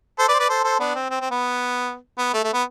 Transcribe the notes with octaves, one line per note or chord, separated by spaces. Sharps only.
A4 C5
B4 D5
C5
B4 D5
A4 C5
A4 C5
B3 D4
C4
C4
C4
B3
B3
A3
A3
B3